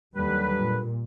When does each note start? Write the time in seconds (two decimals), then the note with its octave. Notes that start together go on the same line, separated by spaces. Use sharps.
0.16 D#2 D3 F#3 G3 B4
0.59 A#2